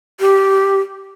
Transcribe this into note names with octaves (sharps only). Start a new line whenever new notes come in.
G4